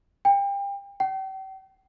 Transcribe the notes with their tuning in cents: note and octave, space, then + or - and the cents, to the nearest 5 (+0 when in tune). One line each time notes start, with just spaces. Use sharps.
G5 +30
G5 -40